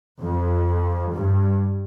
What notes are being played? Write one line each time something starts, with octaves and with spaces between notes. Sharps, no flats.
F2
G2